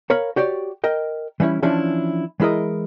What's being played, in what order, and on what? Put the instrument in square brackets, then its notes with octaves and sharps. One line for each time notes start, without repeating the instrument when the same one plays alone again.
[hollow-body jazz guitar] A#4 C#5 F5 B5
F#4 G4 C#5 D5
A#4 D#5 G5
E3 G3 C#4 E4
E3 F3 C#4 D4 E4
E3 G#3 E4 A#4 D#5